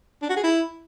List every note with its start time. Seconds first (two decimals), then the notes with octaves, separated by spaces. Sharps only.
0.22 D4
0.29 F#4
0.37 G#4
0.44 E4